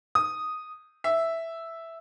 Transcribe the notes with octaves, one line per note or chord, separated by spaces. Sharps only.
D#6
E5